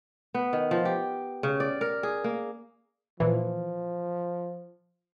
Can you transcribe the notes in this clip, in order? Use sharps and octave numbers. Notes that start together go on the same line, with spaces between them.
B3
D#3
F3
G4
C#3
D5
A#4
G#4
A#3
A#2 E3 F3